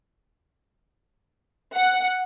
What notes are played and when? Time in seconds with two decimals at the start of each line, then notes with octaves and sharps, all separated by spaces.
1.76 F#5